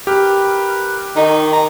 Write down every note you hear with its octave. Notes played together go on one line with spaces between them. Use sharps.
G4 A#4 B4
D#3 D#4 C#6
A#5